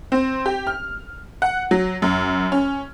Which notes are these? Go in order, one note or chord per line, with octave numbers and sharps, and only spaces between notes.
C4
G4
F6
F#5
F#3
F#2
C#4